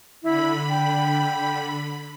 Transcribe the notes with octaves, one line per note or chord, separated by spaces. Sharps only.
D3 E4 B5
G5